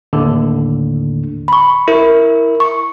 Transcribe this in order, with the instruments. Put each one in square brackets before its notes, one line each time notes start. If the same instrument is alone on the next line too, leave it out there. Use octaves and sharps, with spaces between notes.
[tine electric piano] D#2 A2 D3
[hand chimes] B5 C#6
[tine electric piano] E4 [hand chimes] A#4
[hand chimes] C#6